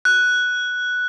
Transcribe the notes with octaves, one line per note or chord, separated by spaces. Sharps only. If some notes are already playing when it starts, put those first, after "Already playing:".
F#6